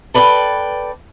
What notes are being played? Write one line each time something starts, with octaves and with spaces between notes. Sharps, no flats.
A4 B4 D5 F5 G5